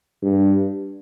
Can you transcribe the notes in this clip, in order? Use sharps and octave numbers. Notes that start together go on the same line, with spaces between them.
G2